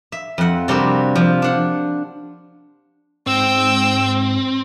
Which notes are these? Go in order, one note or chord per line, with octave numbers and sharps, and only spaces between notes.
E5
F2 F#5
C3 G3 A#3 D4 F#4
F3
D4 F#5
G#2 C4 G5 E6